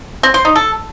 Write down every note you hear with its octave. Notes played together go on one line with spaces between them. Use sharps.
C4
C5
D#4
A4